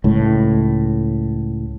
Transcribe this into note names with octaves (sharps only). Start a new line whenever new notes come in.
C#2 A2